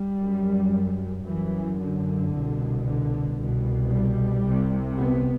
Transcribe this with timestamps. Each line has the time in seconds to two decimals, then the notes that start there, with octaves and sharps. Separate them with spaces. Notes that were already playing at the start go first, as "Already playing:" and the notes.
Already playing: G3
0.20 F#2
1.26 F#2 E3
1.79 D3
2.31 C2 B2
2.85 D3
3.37 C2 B2
3.90 G3
4.43 C2 C3
4.96 B3